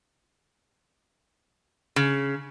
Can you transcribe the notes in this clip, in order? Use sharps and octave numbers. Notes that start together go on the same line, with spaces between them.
C#3